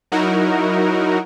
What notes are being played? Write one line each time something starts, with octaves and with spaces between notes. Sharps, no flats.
F#3 D#4 E4 F#4 A#4